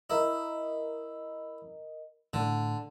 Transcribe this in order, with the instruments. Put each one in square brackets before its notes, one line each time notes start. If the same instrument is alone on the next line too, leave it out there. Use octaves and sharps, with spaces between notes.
[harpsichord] E4 [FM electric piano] A#4 D#5
[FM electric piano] A2 [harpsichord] D3